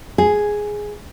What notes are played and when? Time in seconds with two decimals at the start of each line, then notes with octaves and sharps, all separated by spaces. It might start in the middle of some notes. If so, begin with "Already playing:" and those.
0.18 G#4